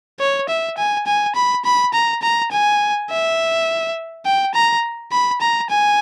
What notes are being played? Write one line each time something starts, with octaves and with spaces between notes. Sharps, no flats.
C#5
E5
G#5
G#5
B5
B5
A#5
A#5
G#5
E5
G5
A#5
B5
A#5
G#5